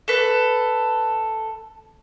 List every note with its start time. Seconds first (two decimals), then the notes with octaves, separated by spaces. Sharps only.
0.08 A4 B4